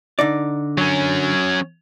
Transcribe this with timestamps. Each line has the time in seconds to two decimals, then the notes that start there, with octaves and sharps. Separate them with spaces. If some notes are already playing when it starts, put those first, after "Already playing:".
0.19 D3 D#4 D5
0.78 F#3 C#4